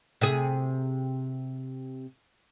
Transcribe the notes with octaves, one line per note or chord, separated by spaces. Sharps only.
C3 G#4